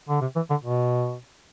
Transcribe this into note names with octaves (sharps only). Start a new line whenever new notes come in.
D3
C3
E3
D3
B2